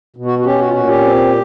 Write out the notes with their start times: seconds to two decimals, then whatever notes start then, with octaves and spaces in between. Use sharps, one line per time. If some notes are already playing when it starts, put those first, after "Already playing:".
0.16 B2
0.25 F#4
0.39 F#4
0.45 C#4 G4
0.59 F#4
0.67 F4
0.73 A#2 F#4
0.87 G4
1.01 C4